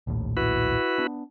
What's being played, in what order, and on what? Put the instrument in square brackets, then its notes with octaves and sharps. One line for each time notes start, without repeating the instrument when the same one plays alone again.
[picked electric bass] A#1 D#2 A2
[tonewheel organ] E4 F#4 B4
[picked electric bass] B3 D4